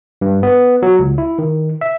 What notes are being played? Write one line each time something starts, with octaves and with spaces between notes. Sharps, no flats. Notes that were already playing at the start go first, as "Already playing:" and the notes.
G2
B3
F#3
C#2
E4
D#3
E5